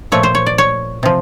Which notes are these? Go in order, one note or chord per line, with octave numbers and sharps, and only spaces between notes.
A#2 F3 A3 C#5
C5
C#5
D5
C#5
C3 F3